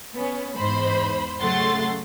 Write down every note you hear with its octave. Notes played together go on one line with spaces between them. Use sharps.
B3 C#4
E2 G#2 C5 B5
C#3 F#3 A3 F#5 C6 A6